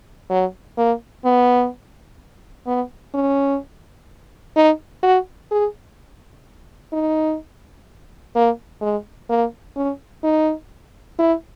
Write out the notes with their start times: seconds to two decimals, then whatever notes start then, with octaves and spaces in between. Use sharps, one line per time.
0.30 F#3
0.78 A#3
1.25 B3
2.67 B3
3.14 C#4
4.56 D#4
5.03 F#4
5.51 G#4
6.93 D#4
8.35 A#3
8.81 G#3
9.30 A#3
9.76 C#4
10.24 D#4
11.19 E4